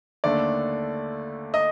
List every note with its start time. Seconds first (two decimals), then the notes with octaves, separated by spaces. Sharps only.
0.24 D#2 D3 A3 D5
1.54 D#5